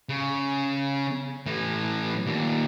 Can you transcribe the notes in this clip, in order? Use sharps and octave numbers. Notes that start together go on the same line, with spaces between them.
C#3
A2 E3
D#2 A#2